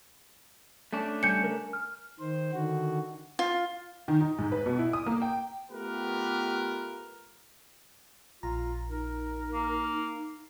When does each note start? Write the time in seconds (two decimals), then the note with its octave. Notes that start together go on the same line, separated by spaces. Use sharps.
0.93 A3 C#4 D4
1.23 C#3 G3 G#5 G6 C#7
1.44 A#4
1.73 F6
2.20 D#3 C5
2.53 D3 D#3 F#4
3.39 F4
4.08 D#3
4.21 D#4
4.39 G#2
4.52 B4
4.66 B2
4.79 E4
4.93 D#6
5.06 A#3
5.22 G5
5.70 A3 B3 F4 G4 A#4 B4
8.43 A#1 F4 A#5
8.89 D#4 A#4
9.53 A#3